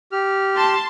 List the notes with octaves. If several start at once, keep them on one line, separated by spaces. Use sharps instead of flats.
G4 F6
A5 C6